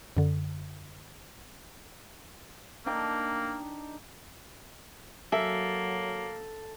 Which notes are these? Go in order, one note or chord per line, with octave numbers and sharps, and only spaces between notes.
F#2 D3
A#3 D4 D#4 G5
F#3 A#3 A4 E5